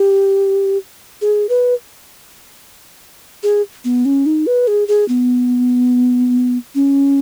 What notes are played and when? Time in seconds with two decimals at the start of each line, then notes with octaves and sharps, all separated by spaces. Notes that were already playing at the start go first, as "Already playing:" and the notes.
Already playing: G4
1.22 G#4
1.49 B4
3.43 G#4
3.85 B3
4.05 C#4
4.26 D#4
4.47 B4
4.67 G#4
4.88 G#4
5.08 B3
6.75 C#4